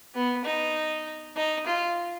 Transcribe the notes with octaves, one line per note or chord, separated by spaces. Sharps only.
B3
D#4
D#4
F4